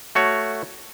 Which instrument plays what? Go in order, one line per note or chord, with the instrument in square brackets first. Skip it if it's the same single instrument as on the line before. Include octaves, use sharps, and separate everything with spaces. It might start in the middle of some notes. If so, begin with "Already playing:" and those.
[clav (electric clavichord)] A3 F#4 C#5